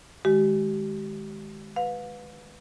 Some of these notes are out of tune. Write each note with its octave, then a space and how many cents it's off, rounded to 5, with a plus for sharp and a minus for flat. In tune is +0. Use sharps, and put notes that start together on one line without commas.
D#3 -10 G#3 +0 G4 -35
B4 +0 F5 +35